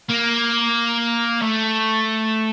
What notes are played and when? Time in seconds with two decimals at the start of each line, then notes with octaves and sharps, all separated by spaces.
0.10 A#3
1.42 A3